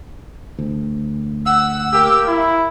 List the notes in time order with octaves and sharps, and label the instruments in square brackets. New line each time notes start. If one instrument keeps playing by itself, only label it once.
[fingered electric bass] D2
[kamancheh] F#5 [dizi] E6
[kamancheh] A#3 [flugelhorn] G4
[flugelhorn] E4